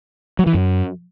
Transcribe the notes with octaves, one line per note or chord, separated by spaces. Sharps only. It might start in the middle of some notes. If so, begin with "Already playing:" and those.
F#3
E3
F#2